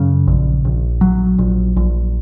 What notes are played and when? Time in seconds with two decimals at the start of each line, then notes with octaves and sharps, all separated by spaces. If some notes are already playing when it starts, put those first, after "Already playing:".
Already playing: F#2 C#3
0.27 A#1
0.65 A#1
1.01 F#3
1.38 A#1
1.76 A#1